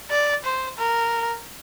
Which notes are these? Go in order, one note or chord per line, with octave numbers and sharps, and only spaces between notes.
D5
C5
A#4